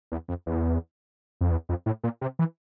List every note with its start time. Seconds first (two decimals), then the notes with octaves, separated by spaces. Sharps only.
0.12 E2
0.28 F2
0.46 E2
1.41 F2
1.51 E2
1.69 F2
1.86 A2
2.04 A#2
2.21 C3
2.39 E3